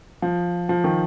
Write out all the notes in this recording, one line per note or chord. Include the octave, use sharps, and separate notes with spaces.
F3
F3
D#3